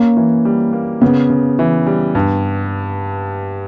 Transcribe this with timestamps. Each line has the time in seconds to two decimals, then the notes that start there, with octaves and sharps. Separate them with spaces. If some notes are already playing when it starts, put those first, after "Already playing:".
Already playing: A#3 C#4
0.17 E3
0.45 G3
0.73 A#3
1.01 C#3 B3
1.30 C#3
1.59 E3
1.86 G3
2.15 G2